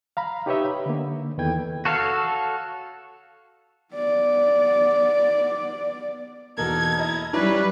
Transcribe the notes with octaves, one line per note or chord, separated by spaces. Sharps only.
F5 A#5 B5
D#4 G4 B4 C#5 D#5 E5
B5
D3 A#3
E2 D#3 A4 B4 G5 G#6
F#4 A4 C#5 F5
B3 D5
E2 B2 A#3 D#4 A4 A#4 G#6
E4 D#5 A#5
F#3 G3 C#4 E4 B4 D5